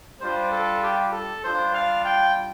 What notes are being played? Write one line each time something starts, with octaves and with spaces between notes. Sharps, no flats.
G3 D4 F4 C5
A4
G4
A4
G3 D4 F4 C5
F5
G5